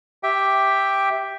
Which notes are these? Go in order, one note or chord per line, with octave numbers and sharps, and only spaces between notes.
G4 E5 G5